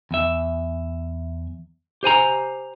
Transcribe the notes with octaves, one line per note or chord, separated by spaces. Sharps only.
E2 E5
G4 C5 G#5 A#5